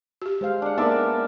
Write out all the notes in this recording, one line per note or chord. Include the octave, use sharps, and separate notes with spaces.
F#4 G4
G#3 C5 F5
D4 F#5
A#3 B3 D#4 A#4 D5 E5 A5